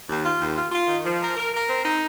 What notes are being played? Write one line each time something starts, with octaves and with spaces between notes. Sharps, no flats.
D#2
F4
D#2
F4
F4
D#3
F3
A#4
A#4
A#4
C4
D#4